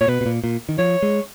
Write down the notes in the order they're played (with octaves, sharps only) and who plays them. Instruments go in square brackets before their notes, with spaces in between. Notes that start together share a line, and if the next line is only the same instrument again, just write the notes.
[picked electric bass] A#2 [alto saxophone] C#5
[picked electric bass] B2 [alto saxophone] B4
[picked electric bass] B2
A#2
A#2
D#3
[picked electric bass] F3 [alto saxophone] C#5
[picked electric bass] G#3